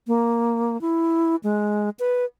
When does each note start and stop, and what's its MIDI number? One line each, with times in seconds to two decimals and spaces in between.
0.07 0.80 58
0.81 1.36 64
1.43 1.90 56
1.99 2.25 71